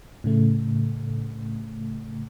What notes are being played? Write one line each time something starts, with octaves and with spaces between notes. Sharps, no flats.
A2 C#3 A3